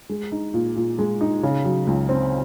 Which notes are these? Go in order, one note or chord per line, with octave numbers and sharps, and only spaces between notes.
G#3
D#4
A#2
A#2
G#3
D#4
C#3
F#3
C#2
C4